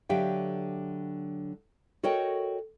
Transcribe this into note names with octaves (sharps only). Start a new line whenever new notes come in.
D3 F#3 G4 E5 F5 G5
F#4 A4 A#4 C#5 D#5 G5